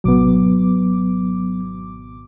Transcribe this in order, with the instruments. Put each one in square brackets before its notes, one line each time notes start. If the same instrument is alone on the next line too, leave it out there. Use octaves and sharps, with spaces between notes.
[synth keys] G#1 B2 D6 [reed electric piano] F#3 B3